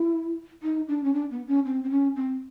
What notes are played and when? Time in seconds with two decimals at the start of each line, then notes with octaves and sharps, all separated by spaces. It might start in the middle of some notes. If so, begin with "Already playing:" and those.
Already playing: E4
0.63 D#4
0.88 D4
1.04 C#4
1.14 D4
1.31 B3
1.48 C#4
1.65 C4
1.84 C4
1.90 C#4
2.16 C4